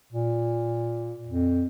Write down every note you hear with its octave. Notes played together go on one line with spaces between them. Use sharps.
A#2
F2